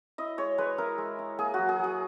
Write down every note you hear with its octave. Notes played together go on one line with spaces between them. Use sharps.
E4 D#5
G#3 C#5
G#3 B4
E4 A#4
G#3
E4
A#3 G#4
F#3 F#4
G#4
F#3 G#4